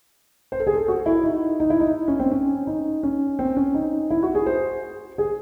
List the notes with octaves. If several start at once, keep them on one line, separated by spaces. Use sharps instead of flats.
C5
A4
G#4
A4
F#4
E4
D#4
D#4
E4
D#4
C#4
C4
C#4
D#4
C#4
C4
C#4
D#4
E4
F#4
G#4
C5
G#4